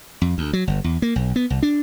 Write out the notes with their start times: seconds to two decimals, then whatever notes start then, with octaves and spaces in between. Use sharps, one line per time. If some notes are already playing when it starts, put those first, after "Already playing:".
0.22 F2
0.38 D2
0.53 F#3
0.67 G1
0.84 E2
1.02 A#3
1.16 B1
1.36 B3
1.50 C2
1.63 D4